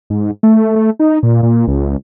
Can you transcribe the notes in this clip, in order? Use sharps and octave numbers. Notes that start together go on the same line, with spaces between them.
G#2
A3
A3
D#4
A#2
A#2
C#2